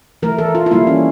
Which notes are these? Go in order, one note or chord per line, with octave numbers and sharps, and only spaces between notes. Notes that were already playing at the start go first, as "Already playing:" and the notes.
E3 A3 A#4
A4
F4
F4
E3 G3 A#3 E4
C#4